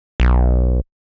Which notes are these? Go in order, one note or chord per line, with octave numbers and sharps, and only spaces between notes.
B1